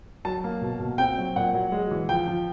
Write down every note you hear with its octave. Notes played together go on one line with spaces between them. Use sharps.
F#3 A5
A#3
B2
B2
C4 G5
F#3
A#2 F#5
F#3
G#3
E3
F3 G5
F3